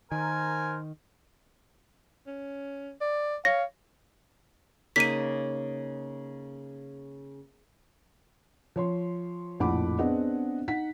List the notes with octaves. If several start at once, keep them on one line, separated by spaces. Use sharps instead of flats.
D#3 A#4 C5 G#5
C#4
D5
C#5 F5 A#6
C#3 A#3 D#4 B6 D#7
F3 C#5 C6
A#1 F2 A2 F#5 B5 D6
B3 C4 D4 G#4 D#5 F#5
D#4 F#5 B6